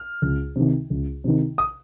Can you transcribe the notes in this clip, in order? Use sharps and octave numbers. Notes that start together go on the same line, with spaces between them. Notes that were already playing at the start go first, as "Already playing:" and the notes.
Already playing: F6
C#2
C3 D#3
C#2
C3 D#3
D#6